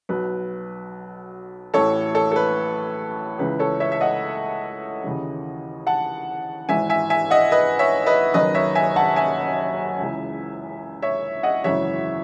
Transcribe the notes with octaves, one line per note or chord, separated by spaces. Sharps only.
B1 B2 B4
A1 A2 E3 A4 C#5
A4 C#5
A4
B4
C#2 C#3 E3 B4
A4 C#5
C#5 E5
E5
D#5 F#5
D#2 C#3 E3
F#5 A5
G#1 G#2 E3 E5 G#5
E5 G#5
E5 G#5
D#5 F#5
B4 D#5
C#5 E5
B4 D#5
F#1 F#2 D#3 B4 D#5
C#5 E5
E5 G#5
F#5 A5
E5 G#5
C#2 C#3 E3
C#5 E5
D#5 F#5
G#1 F#2 C#3 E3 C#5 E5